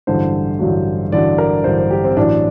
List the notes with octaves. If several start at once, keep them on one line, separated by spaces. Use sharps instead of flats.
A1 G2 D3 F#3 C5
A1 G2 D3 F#3
A1 G2 D3 F#3 D5
A#4
A1 G2 D3 F#3 C5
C5
G4
C4
A1 A2 F#3 D4